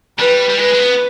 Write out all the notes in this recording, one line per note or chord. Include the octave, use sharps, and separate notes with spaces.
G3 B4
G3
G#3 B4
G#3
B3